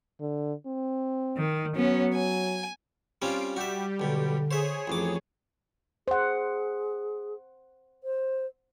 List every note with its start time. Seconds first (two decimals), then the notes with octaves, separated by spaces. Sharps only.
0.20 D3
0.66 C4
1.36 D#3
1.76 F#3 B3 C#4
2.15 G#5
3.22 G3 C4 C#4 F4 F5 D7
3.56 G3 F#4 G4 E5
4.00 B1 B2 D3
4.51 G#4 C5 C#5 E5
4.87 A1 F2 D6
6.08 G#4 C5 F#5
8.04 C5